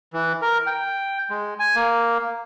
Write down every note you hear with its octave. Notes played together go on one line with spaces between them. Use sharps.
E3
A#4
G5
G#3
G#5
A#3